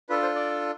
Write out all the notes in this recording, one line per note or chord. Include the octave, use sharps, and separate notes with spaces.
D4 F4 A4 B4
C5
D5